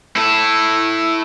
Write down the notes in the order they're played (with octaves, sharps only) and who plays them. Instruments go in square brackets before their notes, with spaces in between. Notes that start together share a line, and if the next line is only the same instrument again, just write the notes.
[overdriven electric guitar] E4 A4